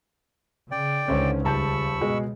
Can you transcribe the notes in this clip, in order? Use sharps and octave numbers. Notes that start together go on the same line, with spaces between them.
C#3 D5 G5
C#2 D3 D#3 C#4 C5
D#1 C#3 A5 B5 C#6 E6 G6
B2 G#3 G#4